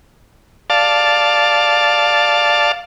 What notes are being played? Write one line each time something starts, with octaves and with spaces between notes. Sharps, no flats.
D5 F5 A5